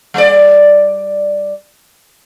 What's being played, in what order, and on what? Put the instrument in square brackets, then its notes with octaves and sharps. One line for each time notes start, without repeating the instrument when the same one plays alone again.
[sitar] G3 D5